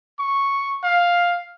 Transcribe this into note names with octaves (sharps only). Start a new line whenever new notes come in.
C#6
F5